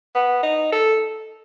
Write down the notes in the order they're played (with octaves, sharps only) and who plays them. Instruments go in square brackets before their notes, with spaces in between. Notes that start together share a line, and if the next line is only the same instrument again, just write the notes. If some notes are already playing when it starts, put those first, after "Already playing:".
[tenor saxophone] B3
D#4
A4